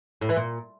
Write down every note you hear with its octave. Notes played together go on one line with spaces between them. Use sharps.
A2
E3
A#2